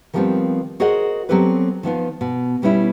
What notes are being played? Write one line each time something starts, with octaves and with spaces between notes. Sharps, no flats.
D#3 F3 G3 A3 B3 C4
F#4 G#4 A#4 C5 D#5 F#5
F#3 B3 C4 G4 A4 B4
D#3 F3 B3 F4
B2
B2 G3 B3 C#4 E4